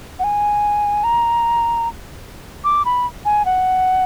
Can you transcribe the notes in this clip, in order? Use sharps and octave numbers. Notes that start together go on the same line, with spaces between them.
F#5
G#5
A#5
D6
B5
G#5
F#5